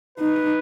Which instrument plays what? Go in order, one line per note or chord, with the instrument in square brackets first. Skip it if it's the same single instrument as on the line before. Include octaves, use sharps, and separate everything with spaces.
[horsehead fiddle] D#4 [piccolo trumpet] B4